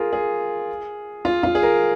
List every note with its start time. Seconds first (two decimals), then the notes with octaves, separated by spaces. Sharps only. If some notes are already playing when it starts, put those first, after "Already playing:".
Already playing: F4 G#4 A#4
0.13 G#4
1.25 F4
1.43 F4
1.55 G#4
1.63 A#4